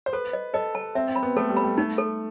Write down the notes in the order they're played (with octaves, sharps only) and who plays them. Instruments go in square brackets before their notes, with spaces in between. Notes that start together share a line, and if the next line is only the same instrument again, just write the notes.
[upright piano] C5
[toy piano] A4 [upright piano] B4
[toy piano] D#5
[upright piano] A4 [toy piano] D#5
[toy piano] A5
[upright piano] C4 [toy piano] E5
[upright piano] C4
[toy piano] B5
[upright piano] B3
[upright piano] A3 [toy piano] A4
[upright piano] G3
[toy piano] B5
[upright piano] G3
[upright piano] A3 [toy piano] D#4
[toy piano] A4